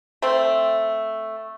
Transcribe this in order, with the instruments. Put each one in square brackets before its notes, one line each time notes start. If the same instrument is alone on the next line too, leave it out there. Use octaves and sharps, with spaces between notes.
[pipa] A3 C4